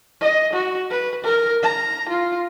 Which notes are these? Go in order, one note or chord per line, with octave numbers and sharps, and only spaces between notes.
D#5
F#4
B4
A#4
A#5
F4